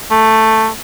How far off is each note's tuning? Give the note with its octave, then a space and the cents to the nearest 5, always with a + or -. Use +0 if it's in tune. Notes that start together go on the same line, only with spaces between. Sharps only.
A3 +5